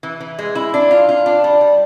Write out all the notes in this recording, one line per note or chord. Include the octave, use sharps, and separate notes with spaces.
E3
E3
G#3
E4
D4
F4
F4
D4
G3
G3